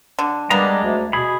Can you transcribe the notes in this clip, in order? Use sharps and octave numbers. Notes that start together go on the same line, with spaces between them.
D3
G3 G#3 A#3 B3 D4 A#5
D2
B2 G#4 B5